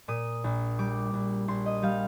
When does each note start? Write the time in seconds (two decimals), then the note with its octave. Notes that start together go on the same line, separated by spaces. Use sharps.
0.08 A#2 D#6
0.44 A#1
0.79 G3 D6
1.14 A#1
1.48 A#1 C6
1.66 D#5
1.82 G3 F5